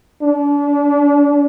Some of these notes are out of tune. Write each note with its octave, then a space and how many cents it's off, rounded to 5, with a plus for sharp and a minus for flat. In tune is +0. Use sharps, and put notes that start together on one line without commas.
D4 -35